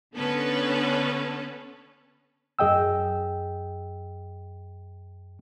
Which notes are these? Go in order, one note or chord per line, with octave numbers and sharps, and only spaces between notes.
D3 B3 C#4 A4 B4
F#2 G#4 D#5 G5 E6